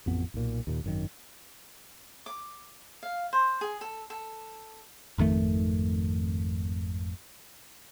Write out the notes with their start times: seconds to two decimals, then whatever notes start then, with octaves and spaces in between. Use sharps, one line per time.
0.06 A1 F2 B3
0.34 B1 A#2
0.67 D#2 A#2
0.84 G#1 F#2 D#3
2.26 D6
3.03 F5
3.33 C5
3.61 G#4
3.81 A4
4.10 A4
5.18 G#1 F2 D#3 A3